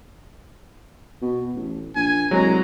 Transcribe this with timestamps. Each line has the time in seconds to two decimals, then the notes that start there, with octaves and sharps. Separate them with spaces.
1.22 B2
1.55 A1
1.95 A#1 G#5
2.31 C2 F#3 G#3 A#5